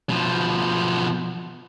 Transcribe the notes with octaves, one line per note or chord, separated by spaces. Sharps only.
B2 F3